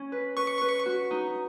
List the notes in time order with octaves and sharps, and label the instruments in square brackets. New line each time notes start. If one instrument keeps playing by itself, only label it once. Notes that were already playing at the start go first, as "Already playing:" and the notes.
Already playing: [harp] C#4
B4
[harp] B4 [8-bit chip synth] C#6
[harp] B4
F#4
D#4